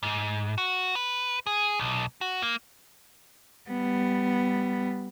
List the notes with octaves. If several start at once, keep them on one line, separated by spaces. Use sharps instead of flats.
G#2
F#4
B4
G#4
B1
F#4
A#3
G3 B3